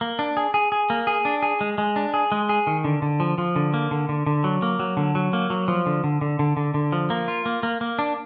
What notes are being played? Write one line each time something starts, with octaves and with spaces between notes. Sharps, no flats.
A#3
D4
G#4
G#4
G#4
A#3
G#4
D4
G#4
G#3
G#3
D4
G#4
G#3
G#4
D#3
D3
D3
F3
F3
D3
A#3
D3
D3
D3
F#3
A#3
F#3
D3
F#3
A#3
F#3
F3
D3
D3
D3
D3
D3
D3
F3
A#3
F4
A#3
A#3
A#3
D4